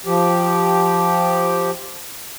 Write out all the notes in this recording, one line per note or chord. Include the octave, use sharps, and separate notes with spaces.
F3 G4